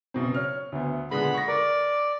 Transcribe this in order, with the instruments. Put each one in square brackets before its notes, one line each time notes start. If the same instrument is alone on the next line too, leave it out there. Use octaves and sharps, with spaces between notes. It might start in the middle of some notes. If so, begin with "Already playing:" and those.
[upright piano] F#1 B2 C4
C#5 F6
D2 B3
[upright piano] A#2 D3 G#3 [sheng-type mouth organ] B3 B5
[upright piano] C#6 A#6
[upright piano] A#4 [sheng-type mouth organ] D5